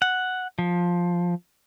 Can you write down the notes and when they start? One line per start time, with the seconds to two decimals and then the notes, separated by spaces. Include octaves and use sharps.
0.02 F#5
0.59 F3